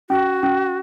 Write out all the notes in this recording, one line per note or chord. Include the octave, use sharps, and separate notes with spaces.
C#4 F#4
C#4